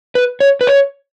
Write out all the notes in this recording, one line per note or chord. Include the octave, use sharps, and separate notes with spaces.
B4
C#5
B4
C#5